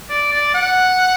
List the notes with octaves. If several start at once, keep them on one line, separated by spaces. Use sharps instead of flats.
D5
D5
F#5